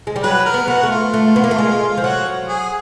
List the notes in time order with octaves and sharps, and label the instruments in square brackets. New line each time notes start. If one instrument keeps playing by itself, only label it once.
[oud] G#3
G3
[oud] F#3 [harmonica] B4
[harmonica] A#4
[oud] B3
[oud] B3 [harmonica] F#4
[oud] A3
[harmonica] F4
[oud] A3
B3
A#3
A3
G#3
F3
[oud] F#3 [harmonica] F#4
[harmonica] G#4